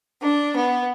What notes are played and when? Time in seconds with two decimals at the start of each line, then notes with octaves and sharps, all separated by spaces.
0.21 D4
0.55 B3